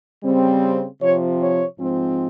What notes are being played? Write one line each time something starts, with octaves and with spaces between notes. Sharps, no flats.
C#3 G3 C4
C3 F3 C4 C#5
C#5
G#2 F3 G#3 C4